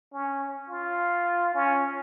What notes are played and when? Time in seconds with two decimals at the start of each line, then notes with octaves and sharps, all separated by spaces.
0.13 C#4
0.69 F4
1.55 C#4